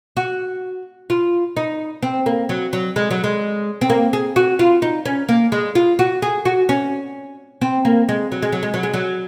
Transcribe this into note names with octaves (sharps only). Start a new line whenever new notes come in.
F#4
F4
D#4
C4
A#3
F#3
F#3
G#3
F#3
G#3
C4
A#3
G#4
F#4
F4
D#4
C#4
A#3
G#3
F4
F#4
G#4
F#4
C#4
C4
A#3
G#3
F#3
G#3
F#3
G#3
F#3
G#3
F#3